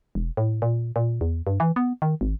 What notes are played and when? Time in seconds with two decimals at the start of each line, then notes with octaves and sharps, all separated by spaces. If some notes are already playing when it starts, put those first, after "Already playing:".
0.15 E1
0.37 A2
0.62 A#2
0.96 A#2
1.21 E2
1.47 G2
1.60 E3
1.76 B3
2.02 D#3
2.21 G#1